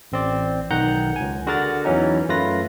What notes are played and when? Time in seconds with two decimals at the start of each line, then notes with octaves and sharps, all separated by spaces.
0.12 A1 C4 D5
0.71 B1 D#3 F#5 A#5 G6
1.16 C#2 G#5
1.47 D3 F#4 G#4 A#4 A#5 A6
1.85 E2 E3 F#3 C#4 D#4
2.29 F#2 A3 F4 B4 A#6